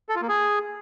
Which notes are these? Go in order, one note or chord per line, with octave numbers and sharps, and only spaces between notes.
A4
F4
A#3
G#4